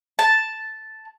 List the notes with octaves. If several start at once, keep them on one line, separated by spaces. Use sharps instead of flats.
A5